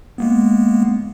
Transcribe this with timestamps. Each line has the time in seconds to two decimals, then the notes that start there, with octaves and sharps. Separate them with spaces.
0.18 G#3 A#3 B3